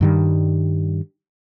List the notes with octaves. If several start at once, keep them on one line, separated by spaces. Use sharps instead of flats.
G2 D#3 G3